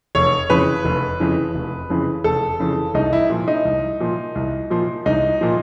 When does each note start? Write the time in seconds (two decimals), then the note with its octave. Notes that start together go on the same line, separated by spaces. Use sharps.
0.15 F1 C#5
0.49 F2 C#3 E3 B4
0.85 F1
1.20 F2 C#3 E3
1.55 F1
1.90 F2 C#3 E3
2.24 F1 A4
2.60 F2 C#3 E3
2.94 C2 D#4
3.13 E4
3.30 A#2 F3
3.48 D#4
3.65 C2
4.00 A#2 F3
4.35 C2
4.70 A#2 F3
5.05 C2 D#4
5.41 A#2 F3